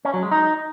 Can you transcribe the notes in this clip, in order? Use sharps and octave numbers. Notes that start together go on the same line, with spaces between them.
C#4
F#3
G#3
D#4